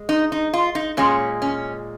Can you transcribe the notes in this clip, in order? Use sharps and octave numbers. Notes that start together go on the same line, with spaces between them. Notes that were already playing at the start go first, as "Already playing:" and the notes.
Already playing: G#3
D#4
D#4
F4
D#4
A#2 G#3 C#4
C#4